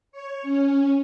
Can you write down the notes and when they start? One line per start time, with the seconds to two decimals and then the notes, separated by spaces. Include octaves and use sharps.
0.12 C#5
0.42 C#4